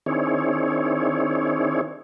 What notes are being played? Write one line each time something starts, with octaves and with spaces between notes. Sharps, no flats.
D#3 C4 D4 E4 G#4 C#5